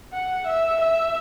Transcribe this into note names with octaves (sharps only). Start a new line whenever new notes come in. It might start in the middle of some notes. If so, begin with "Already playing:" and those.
F#5
E5
E5